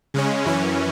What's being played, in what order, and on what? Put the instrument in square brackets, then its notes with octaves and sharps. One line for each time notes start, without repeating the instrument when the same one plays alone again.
[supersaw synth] C#3 G#3 C#4
F#2 E3 C#4